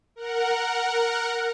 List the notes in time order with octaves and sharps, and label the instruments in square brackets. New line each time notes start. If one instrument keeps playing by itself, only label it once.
[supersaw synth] A#4 F#5